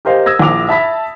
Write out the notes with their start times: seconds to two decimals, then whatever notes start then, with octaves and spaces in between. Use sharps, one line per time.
0.05 G4 A#4 C5 D#5 F5
0.26 D#6 E6 G#6 A#6
0.39 A#1 E4 D6 F7
0.69 E5 A5 B5 B6